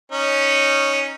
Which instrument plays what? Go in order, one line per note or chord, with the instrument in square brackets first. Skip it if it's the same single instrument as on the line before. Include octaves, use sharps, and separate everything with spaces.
[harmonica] C#4 D#4